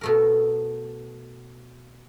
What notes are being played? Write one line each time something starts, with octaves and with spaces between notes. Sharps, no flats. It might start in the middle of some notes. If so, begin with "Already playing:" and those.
B2 A3 A#4